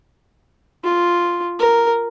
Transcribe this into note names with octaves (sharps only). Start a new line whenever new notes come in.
F4
A#4